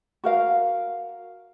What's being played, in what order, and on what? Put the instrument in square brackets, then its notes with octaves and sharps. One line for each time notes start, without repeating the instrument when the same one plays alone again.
[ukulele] F#4 A#4 F5